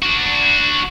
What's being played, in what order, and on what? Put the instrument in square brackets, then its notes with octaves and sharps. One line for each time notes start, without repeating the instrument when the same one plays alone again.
[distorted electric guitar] D4 F#4